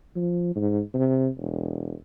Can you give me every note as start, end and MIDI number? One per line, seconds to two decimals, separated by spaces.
0.16 0.55 53
0.56 0.80 44
0.94 1.28 48
1.37 1.93 28